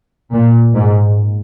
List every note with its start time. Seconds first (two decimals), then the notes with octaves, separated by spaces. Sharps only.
0.34 A#2
0.76 G#2